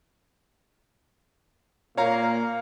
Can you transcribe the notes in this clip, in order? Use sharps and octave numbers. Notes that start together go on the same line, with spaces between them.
A#2 A#3 C#5 F5 A#5